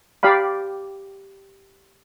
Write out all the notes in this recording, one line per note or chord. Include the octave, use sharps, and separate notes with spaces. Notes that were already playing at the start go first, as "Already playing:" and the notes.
G4 D5 F5 B5